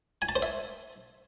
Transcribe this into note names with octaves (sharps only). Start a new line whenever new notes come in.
G#5
A5
C5
E5